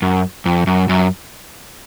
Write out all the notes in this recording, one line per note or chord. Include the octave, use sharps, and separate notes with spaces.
F#2
F2
F#2
F#2